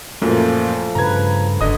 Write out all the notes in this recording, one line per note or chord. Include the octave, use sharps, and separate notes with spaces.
F#2 A#2 F3 A3
G2 C#3 B4 A#5 G#6
F1 D3 D#5 D#6